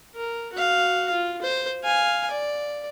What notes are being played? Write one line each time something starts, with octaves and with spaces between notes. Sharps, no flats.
A#4
F#4 F5
F4
C5
F5 G#5
D5